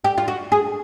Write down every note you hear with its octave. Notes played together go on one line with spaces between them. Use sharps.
G4
F4
F#4
G#4